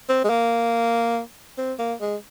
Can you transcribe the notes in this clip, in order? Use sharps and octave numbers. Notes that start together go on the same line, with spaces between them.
C4
G#3
A#3
C4
A#3
G#3